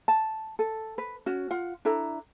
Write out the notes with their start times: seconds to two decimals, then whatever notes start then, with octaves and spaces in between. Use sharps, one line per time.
0.08 A5
0.59 A4
0.98 B4
1.26 C#4 F#4
1.51 F4 F#5
1.85 D4 E4 A4 A#5